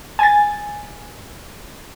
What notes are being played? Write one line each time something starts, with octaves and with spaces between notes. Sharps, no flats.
G#5 A6